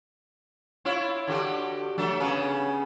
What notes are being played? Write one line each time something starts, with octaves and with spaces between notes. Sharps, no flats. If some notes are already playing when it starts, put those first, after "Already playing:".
E4 F4 C#5
D3 F#4 G4
F#3 A3 D4
C#3 B3 C#4